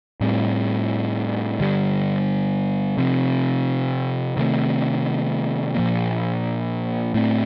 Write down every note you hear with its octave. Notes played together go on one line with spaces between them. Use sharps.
A2 G3 C4
G2 D3 G3
C3 F3 C4
C3 D#3 A3 C4
A#2 F3 A#3
A2 A3 C4